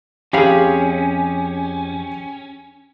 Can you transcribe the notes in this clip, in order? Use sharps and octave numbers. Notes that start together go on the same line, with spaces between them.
F2 C#4 G4 G#4 F5 B5